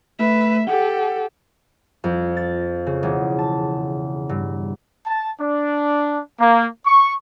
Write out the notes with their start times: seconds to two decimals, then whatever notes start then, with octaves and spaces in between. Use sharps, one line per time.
0.19 A3 B4 E5
0.67 G4 A4 F#5
2.04 F2
2.37 A6
2.86 C#3
3.03 E1
3.39 A5
4.29 G2
5.06 A5
5.41 D4
6.40 A#3
6.85 C#6